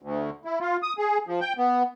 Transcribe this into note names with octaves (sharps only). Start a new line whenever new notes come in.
D2
E4
F4
D#6
G#4
F3
G5
B3